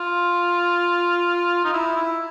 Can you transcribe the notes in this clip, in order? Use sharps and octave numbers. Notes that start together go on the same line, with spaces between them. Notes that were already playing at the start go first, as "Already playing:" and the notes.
Already playing: F4
D#4
E4
E4